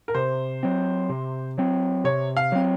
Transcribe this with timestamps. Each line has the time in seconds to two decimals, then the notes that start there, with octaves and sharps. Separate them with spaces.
0.08 A#4
0.15 C3 C5
0.63 F#3 C4
1.09 C3
1.58 F#3 C4
2.04 C3 C#5
2.37 F5
2.52 F#3 C4